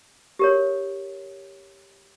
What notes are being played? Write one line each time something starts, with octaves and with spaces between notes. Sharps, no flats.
G4 A#4 C#5